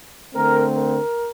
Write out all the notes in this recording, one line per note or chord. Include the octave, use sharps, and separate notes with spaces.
D3 A3 C4 A#4
A#4